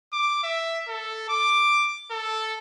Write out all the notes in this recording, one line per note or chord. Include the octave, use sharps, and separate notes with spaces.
D6
E5
A4
D6
A4